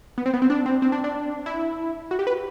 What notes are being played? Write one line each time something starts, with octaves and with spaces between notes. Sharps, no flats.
B3
C4
B3
C4
D4
C4
C4
D4
D4
E4
F#4
G4
B4